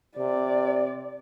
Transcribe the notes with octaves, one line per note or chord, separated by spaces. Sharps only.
C3 D5